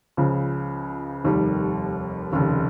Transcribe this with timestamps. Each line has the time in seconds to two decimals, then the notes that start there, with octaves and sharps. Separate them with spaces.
0.17 C#2 C#3 F3
1.24 F1 D#2 D#3 G3
2.32 F1 D#2 C#3